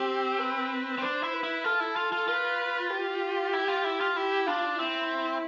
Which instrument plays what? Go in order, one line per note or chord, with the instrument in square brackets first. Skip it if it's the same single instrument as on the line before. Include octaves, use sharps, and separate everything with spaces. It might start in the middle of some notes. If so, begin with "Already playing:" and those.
Already playing: [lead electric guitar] C4 [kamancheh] G4
[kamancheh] B4
[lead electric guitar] C4
[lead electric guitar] D4 [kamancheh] C5
[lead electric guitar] E4
[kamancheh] B4
[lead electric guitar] E4
[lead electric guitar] F4 [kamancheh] A4
[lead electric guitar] E4
F4
F4
[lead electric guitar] F4 [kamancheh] B4
[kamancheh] G4
[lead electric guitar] E4
F4
E4
F4
[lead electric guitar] E4 [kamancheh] G4
[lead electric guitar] D4 [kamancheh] F4
[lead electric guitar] C4 [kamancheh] E4